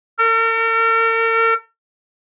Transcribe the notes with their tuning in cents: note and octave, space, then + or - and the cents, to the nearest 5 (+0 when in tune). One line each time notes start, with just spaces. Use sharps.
A#4 -45